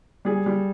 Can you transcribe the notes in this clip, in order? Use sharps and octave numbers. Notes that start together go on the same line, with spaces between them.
G3 G#4
G3